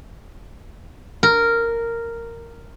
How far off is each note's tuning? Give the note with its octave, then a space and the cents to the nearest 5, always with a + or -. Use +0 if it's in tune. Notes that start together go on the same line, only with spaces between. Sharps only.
A#4 -10